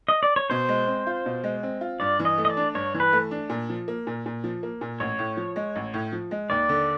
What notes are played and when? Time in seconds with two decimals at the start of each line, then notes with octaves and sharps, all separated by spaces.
0.08 D#5
0.23 D5
0.36 C#5
0.50 B2 C5
0.69 G#3
0.87 C4
1.07 F4
1.26 B2
1.44 G#3
1.63 C4
1.81 F4
2.00 G2 D5
2.19 E3
2.25 D#5
2.38 A3
2.45 D#5
2.50 D5
2.57 D4
2.75 G2 C#5
2.94 E3
3.00 B4
3.12 A3
3.31 D4
3.49 A#2
3.69 F3
3.88 A#3
4.07 A#2
4.26 A#2
4.44 F3
4.63 A#3
4.81 A#2
5.00 A1 C#5
5.19 A2
5.37 F3
5.56 G#3
5.76 A1
5.94 A2
6.12 F3
6.31 G#3
6.50 D#2 D5
6.69 D3